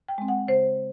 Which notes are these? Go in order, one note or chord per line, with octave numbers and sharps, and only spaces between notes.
G5
G#3 C4
F#5
C#3 C5